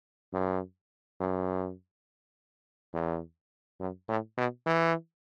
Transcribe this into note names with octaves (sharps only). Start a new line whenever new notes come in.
F#2
F#2
E2
F#2
A2
B2
E3